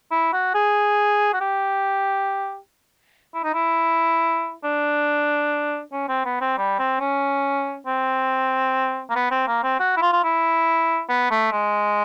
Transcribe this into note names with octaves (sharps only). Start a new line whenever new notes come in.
E4
F#4
G#4
F#4
G4
E4
D#4
E4
D4
C#4
C4
B3
C4
G3
C4
C#4
C4
A#3
B3
C4
A#3
C4
F#4
E4
F4
F4
E4
B3
A3
G#3